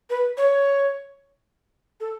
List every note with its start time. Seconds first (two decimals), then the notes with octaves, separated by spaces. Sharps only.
0.10 B4
0.37 C#5
2.00 A4